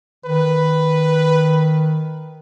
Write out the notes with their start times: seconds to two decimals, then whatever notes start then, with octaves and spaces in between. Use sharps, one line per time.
0.25 D#3 B4